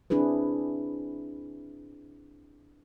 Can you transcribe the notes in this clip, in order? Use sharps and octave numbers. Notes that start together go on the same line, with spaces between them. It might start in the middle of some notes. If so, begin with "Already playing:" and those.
C4 D4 E4 G#4 B4